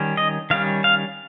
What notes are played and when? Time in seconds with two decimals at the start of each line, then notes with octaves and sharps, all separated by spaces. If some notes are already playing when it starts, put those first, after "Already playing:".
Already playing: D#3 G3 C#4
0.17 D#5
0.50 D#3 G3 C#4 F5
0.84 F5